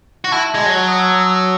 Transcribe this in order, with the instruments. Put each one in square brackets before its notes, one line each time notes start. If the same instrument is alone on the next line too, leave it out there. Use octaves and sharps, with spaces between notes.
[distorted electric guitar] F#4
[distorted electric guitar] E4 [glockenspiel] A5
[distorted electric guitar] G#3
F#3
[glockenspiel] D#6
E6